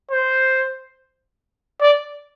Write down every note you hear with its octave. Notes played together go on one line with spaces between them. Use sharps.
C5
D5